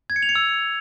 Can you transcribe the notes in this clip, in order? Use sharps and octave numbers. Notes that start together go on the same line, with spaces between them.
G#6
C#7
F7
C#7
E6